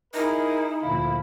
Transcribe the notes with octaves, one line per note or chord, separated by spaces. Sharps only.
D#4 E4 G#4 A#4
D2 A#2 F3 E4 F5 B5